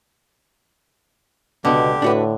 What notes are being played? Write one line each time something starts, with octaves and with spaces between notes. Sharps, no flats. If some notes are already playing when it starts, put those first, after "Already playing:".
C#2 B2 D3 B3 G4
A2 D4 F#4 B4